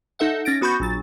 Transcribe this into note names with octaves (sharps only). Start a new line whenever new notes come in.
D#4 A4 E5 F#5
C#4 A6 A#6 D7
B3 F#4 B5 C#6 G6
A#1 F#3 A6